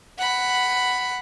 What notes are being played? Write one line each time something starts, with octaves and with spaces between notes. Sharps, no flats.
F#5 B5